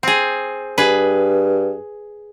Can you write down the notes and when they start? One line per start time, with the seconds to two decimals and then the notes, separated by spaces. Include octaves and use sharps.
0.03 C4 G#4
0.78 G2 G#4 B4